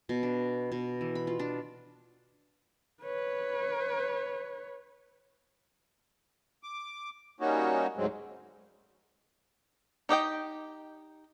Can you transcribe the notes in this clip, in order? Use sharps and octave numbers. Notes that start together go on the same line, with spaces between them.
B2
D4
B2
E3
B5
F4
D4
B4 C#5
D6
G3 A#3 C#4 D#4 F#4
D2 G#2 F#3 G#3 C4
D#4 G4 D#5 G5